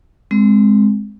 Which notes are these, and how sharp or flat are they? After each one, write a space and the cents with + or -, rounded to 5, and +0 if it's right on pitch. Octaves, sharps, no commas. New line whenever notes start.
G#3 +0 C4 +0